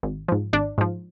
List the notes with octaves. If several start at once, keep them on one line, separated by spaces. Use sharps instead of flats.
G#1
G#2 F3
G#1 D4
G#2 F3